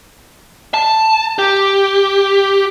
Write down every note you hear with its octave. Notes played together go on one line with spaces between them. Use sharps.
A5
G4